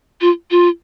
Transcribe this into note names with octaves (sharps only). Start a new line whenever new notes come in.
F4
F4